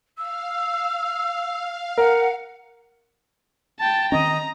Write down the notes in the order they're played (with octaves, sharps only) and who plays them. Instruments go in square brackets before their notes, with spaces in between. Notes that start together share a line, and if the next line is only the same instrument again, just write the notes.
[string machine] F5 [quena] E6
[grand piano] A#4 [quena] F#5
[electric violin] G5 A5 [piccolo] A6
[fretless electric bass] D#3 C4 C#4 [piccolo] D#5 [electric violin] A#5